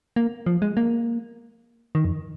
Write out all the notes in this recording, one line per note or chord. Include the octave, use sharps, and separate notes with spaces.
A#3
F3
G#3
A#3
D#3
F2